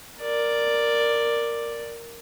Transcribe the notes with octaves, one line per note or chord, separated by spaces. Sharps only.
A#4 D5